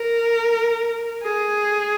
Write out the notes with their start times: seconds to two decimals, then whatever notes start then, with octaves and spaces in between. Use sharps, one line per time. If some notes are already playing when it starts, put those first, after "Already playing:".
Already playing: A#4
1.24 G#4